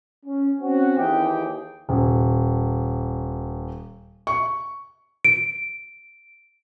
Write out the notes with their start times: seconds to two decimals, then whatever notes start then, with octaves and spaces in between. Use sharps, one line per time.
0.24 C#4
0.60 C4 C#4 F#4
0.97 D#2 D#3 E3 G4 G#4 G5
1.89 D#1
4.27 C#6
5.25 D7